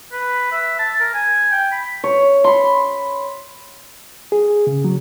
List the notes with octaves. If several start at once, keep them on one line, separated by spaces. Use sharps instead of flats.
B4
E5
A5
A#4
G#5
G5
B5
C#5
B5 C6
G#4
C#3
F#3